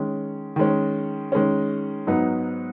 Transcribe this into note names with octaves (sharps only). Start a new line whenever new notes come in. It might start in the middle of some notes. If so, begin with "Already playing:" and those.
Already playing: D#3 G#3 C#4
D#3 G#3 C#4
D#3 G#3 C#4
G#2 F#3 B3 D#4